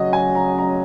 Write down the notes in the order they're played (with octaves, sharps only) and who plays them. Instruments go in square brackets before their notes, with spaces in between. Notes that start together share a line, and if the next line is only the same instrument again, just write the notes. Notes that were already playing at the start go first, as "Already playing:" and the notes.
Already playing: [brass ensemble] C#3 F#3 C#4 [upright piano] D#5
[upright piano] G#5
A#5
A#5